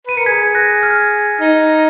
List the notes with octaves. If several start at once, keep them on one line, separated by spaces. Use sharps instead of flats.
B4 D#7
A#4 C#7
G#4 G#6 B6
F#6 A#6
F6 G#6
D#4